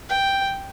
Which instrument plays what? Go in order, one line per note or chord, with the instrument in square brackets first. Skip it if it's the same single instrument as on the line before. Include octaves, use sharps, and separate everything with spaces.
[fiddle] G5